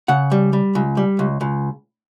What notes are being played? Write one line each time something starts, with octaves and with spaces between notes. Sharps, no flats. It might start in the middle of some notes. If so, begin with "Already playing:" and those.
C#3 F#5
G3
G3
C#2
G3
C#2
C#2